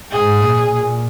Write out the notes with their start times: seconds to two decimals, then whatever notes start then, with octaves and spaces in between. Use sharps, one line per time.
0.10 G#2 G#4
0.40 A#2
0.70 A#2